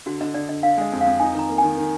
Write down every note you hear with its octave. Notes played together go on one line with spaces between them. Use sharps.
D3 F#4
D3 D#5
D3 D5
D3 D#5
D3 F5
G#3 D#5
F2
F5
F2
D#4 G#5
D#3 A#5
A#3
D#3 G#5
D#3